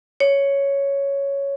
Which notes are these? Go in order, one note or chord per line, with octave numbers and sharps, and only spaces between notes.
C#5